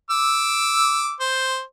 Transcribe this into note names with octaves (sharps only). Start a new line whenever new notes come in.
D6 E6
C5